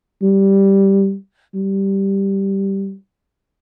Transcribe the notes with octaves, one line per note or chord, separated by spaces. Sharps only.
G3
G3